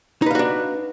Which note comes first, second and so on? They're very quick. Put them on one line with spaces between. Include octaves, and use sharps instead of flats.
D#4 B4 F5 F#4 D4